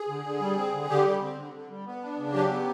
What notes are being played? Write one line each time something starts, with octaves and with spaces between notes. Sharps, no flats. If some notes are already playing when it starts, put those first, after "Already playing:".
Already playing: G#4
D3
D3
G3
C4
D3
D3 G4
G3
C4
D3
D3
G3
B3
D4
C#3
F#3 G4
B3